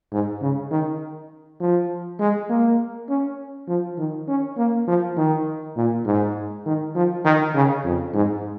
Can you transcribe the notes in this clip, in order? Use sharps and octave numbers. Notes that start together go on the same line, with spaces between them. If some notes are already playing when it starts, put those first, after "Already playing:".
G#2
C#3
D#3
F3
G#3
A#3
C#4
F3
D#3
C#4
A#3
F3
D#3
A#2
G#2
D#3
F3
D#3
C#3
F2
G#2